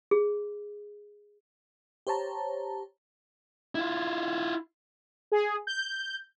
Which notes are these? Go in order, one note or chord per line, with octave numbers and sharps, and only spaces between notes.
G#4
G4 C5 C#5 A5 A#5
E4 F4
G#4
G6